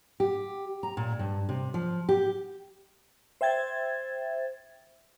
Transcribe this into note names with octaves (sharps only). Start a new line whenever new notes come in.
G4
A#5
A#2
G2
C3
F3
G4
C5 E5 G5 G#6 A6